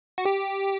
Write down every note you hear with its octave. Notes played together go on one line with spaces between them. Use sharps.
F#4
G4